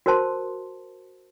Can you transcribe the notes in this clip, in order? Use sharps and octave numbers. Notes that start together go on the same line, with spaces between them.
F#4 A#4 C5 A5 C6